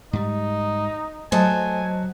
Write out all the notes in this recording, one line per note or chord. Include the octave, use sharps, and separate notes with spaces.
G#2 G3 D#4
F#3 A3 C5 D#5 G#5 A5